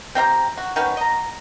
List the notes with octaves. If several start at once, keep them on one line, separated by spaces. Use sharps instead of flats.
C4 G4 E5 A#5
F#4
D#3 C#4 F#4 B4
D#5 A#5